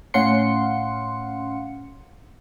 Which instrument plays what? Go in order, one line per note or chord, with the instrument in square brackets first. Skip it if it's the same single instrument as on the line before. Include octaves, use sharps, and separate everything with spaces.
[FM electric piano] A2 C#4 F5 F#5 C6 C#7